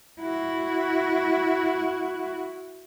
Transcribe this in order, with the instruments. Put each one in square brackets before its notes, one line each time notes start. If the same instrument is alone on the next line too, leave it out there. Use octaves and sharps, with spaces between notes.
[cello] E4 F#4